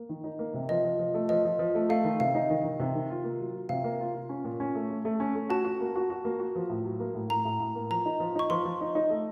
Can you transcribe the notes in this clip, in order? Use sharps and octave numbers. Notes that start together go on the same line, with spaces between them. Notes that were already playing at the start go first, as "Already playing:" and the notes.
Already playing: A#3
D#3
D#4
A#3
C3
F3 D#5
F3
F3
A3
F3 D#5
F3
F3
A3
A3 F5
D#3
C3 F5
D#4
D#3
D#3
C3
D#3
F4
A#3
F#3
F4
C3 F5
A#3
F4
F4
C#4
A#2
C#4
A3
A3
A3
C#4
A3
F#4 A5
F#4
A#3
F#4
F#4
A#3
F#4
F3
A2
F#3
A#3
A2
A2 A#5
A2
A2
A#3
F3 A#5
D#4
F3
D#4 C#6
F3 C6
F3
D#4
D#4
A3